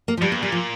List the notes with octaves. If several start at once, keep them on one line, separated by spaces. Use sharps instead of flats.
A#3
F3
G2 G3
A#3
A#2 G3
F3